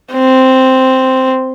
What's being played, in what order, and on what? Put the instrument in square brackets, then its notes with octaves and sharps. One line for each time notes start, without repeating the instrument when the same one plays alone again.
[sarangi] C4